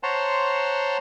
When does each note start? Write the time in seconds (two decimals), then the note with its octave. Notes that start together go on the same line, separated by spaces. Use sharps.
0.03 C5 C#5 F#5 A5 A#5 C6